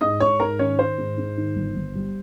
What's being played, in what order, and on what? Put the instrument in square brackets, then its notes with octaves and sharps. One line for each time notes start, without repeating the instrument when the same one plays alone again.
[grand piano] G#2 [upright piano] D#5 D#6
[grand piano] G#2 [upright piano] C#5 C#6
[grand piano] G#2 [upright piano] A#4 A#5
[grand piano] D#3 [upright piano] C#4 C#5
[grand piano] D#3 [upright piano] C5
[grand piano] G#2
G#2
D#3
G1
G1
G3